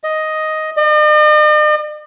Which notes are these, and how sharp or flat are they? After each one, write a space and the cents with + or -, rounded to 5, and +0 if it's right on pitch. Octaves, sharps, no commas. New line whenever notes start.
D#5 +5
D#5 -45